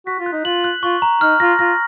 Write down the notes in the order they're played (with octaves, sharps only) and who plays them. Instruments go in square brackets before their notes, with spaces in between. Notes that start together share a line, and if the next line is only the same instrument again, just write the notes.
[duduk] F#4 [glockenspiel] B6
[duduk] F4
[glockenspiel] F#6
[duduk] D#4
[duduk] F4 [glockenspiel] F#7
[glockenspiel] F#6
[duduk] F4 [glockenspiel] C#6
[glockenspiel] A#5
[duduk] D#4 [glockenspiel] F6
[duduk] F4 [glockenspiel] A#6
[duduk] F4 [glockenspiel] A#6